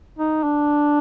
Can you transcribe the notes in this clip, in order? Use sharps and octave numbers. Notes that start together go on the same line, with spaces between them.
D#4
D4